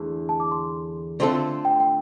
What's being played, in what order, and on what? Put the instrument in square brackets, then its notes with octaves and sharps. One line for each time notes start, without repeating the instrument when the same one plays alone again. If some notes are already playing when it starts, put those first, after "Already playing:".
Already playing: [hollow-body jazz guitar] E2 D3 A3
[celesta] A5
D6
C6
[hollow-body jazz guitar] D3 A3 C4 F4 A4
[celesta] G5
G5